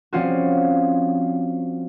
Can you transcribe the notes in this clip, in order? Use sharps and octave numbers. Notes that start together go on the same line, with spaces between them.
F3 G3 C4 C#4 F4 F#4